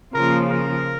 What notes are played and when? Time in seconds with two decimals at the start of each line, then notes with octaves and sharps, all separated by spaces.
0.14 C#3 F3 A#3 F4 A#4
0.51 A#4